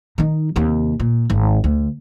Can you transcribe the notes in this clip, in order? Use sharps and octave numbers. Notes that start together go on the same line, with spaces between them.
D#3 D#4
D#2 C3
A#2
G#1
D2